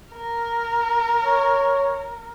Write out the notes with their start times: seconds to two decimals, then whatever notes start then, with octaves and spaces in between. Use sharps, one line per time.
0.13 A#4
1.22 C#5